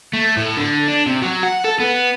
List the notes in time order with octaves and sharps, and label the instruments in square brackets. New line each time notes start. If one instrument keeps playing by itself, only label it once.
[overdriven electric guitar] A3
A2
D3
D4
C3
F#3
F#5
A4
B3